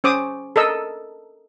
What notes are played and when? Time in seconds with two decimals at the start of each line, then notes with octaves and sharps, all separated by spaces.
0.04 C#4 C5 D6 D#6
0.56 A4 A#4 D#5 E6